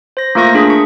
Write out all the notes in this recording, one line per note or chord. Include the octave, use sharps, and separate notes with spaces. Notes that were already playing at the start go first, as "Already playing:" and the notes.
C5 A#6
A3 A#3 F4 A#4 C#6 A#6
D4 G#4 B6
C#6